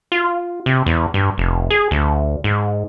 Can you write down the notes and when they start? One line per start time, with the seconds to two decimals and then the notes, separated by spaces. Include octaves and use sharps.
0.12 F4
0.66 C3
0.86 E2
1.14 G2
1.38 F1
1.70 G#4
1.91 D2
2.44 G#2